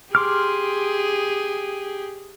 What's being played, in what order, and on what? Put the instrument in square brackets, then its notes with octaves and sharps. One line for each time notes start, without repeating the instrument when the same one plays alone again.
[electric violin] G4 G#4 [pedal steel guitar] C6 D6 F6